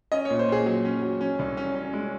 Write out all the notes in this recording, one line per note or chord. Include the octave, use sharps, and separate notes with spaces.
C#4 D#5
A#2 C#5
C5
A#2 G#4
F#3
C#4
F#3
C#4
C2
C#4
C#4
G#3